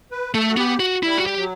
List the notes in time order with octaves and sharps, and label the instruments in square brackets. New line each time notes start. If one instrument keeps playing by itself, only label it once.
[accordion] B4
[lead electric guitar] A3 [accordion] A4
[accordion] F#4
[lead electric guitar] B3 [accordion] G4
[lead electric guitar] F#4
[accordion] G3 [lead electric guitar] E4
[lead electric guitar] F#4
G4
[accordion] F#3